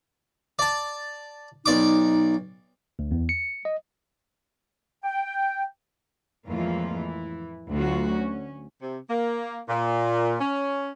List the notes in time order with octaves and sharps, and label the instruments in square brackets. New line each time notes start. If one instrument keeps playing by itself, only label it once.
[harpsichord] D5 A5
[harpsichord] B1 D5 D6 [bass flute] D#4
[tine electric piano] D2
E2
C#7
D#5
[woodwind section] G5
[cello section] F2 A2 E3 G#3 A#3 F4
E3
D2 F#3 F4 F#4
C#4
[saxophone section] C3
A#3
A#2
C#4